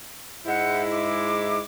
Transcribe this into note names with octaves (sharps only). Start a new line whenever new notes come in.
G#2 G#3 E4 F#5 G6
D6